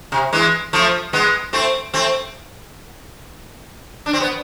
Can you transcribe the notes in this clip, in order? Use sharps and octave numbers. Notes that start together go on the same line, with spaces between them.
C3
E3 G#3
F3 A3
G#3 B3
A3 C4
A3 C4
D4
C4
B3